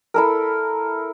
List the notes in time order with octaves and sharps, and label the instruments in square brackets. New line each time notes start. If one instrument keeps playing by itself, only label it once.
[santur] E4 A4 A#4